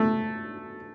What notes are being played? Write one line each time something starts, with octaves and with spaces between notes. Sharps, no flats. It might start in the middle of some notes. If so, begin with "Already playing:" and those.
Already playing: A3